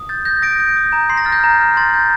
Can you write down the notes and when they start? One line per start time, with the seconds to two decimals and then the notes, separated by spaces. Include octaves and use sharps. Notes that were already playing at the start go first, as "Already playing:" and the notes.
Already playing: D#6
0.09 G6 A6
0.25 G6 A#6
0.42 D#6 A#6 D7
0.60 G6
0.77 D#6
0.93 A#5
1.09 C6 C7
1.17 A#6
1.25 F6 A6
1.32 G6 A#6
1.44 A#5
1.61 F6
1.77 C6 A6
1.94 G6